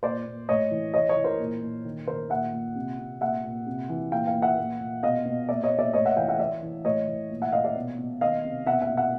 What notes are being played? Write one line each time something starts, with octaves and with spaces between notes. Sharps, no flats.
A#2 C5 D5
A#2
A2 C#5 D#5
E3
E3 C#5 D#5
C#5 D#5
E3
A#4 C5
A#2
A#2
D#3
D#3 A#4 C5
A#2 E5 F#5
A#2
C3
C3
A#2 E5 F#5
A#2
C3
E3
A#2 F5 G5
F5 G5
A#2
E5 F#5
A#2
A#2
B2 D#5 F5
B2
A#2 D5 E5
C#5 D#5
A#2
D5 E5
A2 C#5 D#5
E5 F#5
E3 F5 G5
E5 F#5
E3 D5 E5
E3
A2 C#5 D#5
E3
A#2
E5 F#5
A#2 D#5 F5
D5 E5
B2
B2
D#3 D#5 F5
C3
B2 E5 F#5
E5 F#5
B2
E5 F#5